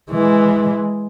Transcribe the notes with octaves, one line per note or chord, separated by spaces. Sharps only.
E3 G#3